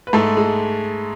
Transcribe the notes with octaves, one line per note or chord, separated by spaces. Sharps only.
B4
G#2 A3 A4
G#3